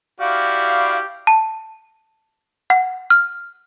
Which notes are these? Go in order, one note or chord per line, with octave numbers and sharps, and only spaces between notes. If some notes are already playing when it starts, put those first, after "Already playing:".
E4 F#4 G4 D5 F5
A5
F#5
F6